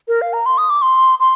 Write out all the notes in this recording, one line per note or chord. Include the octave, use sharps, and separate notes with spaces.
A#4
F5
A#5
C6
D#6
D6
C6
C6